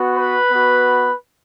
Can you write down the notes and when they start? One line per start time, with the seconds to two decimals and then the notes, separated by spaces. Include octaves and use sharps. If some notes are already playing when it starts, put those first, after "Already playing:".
Already playing: B3 F#4
0.14 B4 B5
0.51 B3 F#4